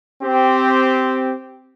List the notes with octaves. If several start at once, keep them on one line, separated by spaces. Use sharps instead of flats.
C4 G4